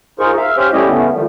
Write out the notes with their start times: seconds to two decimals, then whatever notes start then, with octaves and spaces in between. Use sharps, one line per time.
0.19 D#4 F4 G#4 A#4 C5 C#6
0.37 E5 F5
0.57 C#4 G4 C5 F5
0.73 G3 A3 C#4 E4 G4 D#5
0.87 C#3 A3 B3 C#4
1.13 D#3 F3 G3 A3